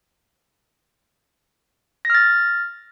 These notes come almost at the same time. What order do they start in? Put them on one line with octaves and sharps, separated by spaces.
A#6 F6 A6